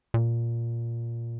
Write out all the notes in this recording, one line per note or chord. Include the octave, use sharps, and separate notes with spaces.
A#2